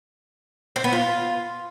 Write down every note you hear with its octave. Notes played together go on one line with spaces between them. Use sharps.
C4
B3
F4